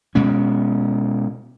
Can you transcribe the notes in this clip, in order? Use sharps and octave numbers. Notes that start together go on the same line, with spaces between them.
B2 G#3 C#4